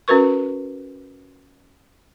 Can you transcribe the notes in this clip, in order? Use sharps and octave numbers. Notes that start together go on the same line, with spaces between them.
C#4 F#4 A#4 B4 C#6